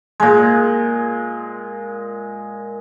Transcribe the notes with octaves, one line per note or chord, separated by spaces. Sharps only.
A#2 G#3